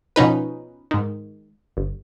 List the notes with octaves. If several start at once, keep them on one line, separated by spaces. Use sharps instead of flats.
B2 F3 C#4 D#4 B4
G#2 D#3
G1